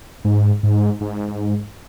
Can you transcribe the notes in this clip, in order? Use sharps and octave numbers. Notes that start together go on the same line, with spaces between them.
G#2
G#2
G#2